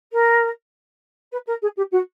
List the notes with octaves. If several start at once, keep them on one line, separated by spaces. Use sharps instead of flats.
A#4
B4
A#4
G#4
G4
F#4